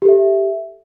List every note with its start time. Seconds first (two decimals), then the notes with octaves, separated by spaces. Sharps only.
0.02 G4
0.05 A4
0.09 E5